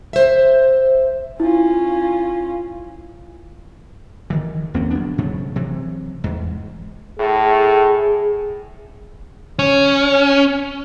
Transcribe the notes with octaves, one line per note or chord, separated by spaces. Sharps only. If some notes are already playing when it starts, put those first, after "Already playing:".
C5 E5
C#4 E4 F4
D#3 E3
E2 A#3 C4 C#4
G1 F#3 B3 D4
G#2 C#3 F#3 A3
C3 E3 F#3
E2 G#2
A2 G#4
C#4